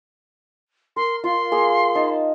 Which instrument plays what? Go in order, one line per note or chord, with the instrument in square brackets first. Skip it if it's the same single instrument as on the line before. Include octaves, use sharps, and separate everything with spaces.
[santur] A#4 [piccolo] C6
[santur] F4 [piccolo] C6
[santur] A#3 G#4
D#4 A5